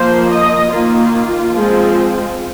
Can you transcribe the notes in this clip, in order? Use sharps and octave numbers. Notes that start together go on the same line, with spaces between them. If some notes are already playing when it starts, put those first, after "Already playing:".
Already playing: F3 A#3 C5
D#5
D#3 A#3 F4
F3 G#3 C4